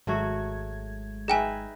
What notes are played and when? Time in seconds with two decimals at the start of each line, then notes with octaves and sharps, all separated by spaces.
0.07 G#1 F#3 G#3 A3 F#4 G#6
1.28 D#4 G#4 B4 E5 G5 G#5